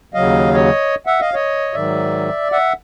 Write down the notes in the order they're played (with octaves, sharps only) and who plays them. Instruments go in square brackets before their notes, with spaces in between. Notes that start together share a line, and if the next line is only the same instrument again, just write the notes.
[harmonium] D#2 C#3 F#3 D#5 F5
C#5 D#5
E5 F#5
D#5 F5
C#5 D#5
G#2 D#3 F#3 D5 E5
E5 F#5